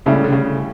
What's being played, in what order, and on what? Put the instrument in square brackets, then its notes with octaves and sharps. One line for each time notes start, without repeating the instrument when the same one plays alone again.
[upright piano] A2 G3 C#4 E4 A4 [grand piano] C#3
[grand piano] D3
C#3